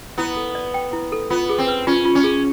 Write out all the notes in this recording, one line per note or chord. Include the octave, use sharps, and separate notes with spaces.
B3 E4
A4
D5
G5
E4
A4
B3 F4
G#4
C4
B4
C#4 F4
F4
C#4
G#4